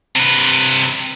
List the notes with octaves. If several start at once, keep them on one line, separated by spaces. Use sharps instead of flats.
C3 B4